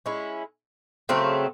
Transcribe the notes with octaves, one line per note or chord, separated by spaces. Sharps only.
G#3 C#4 E4
C#3 F#3 A3 C4